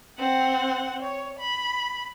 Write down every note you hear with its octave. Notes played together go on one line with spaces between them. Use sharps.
C4 F#5
C#5
B5